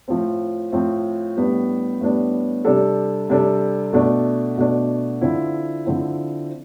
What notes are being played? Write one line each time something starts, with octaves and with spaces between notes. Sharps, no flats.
A2 F3 C4
A2 F3 C4
A2 G3 B3 D4
A2 G3 B3 D4
C3 G3 D4 A4
C3 G3 D4 A4
B2 A3 D4
B2 A3 D4
D3 F3 C4 E4
D3 F3 C4 E4